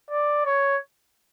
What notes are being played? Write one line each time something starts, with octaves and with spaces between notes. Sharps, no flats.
D5
C#5